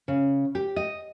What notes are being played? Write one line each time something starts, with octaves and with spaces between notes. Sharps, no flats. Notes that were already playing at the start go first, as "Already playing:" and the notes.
C#3
G4
D#5